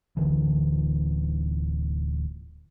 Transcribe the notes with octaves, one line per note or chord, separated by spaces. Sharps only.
D1 G#1 D3 E3